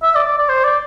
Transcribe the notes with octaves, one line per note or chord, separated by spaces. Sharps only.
E5
D5
D5
D5
C5
D5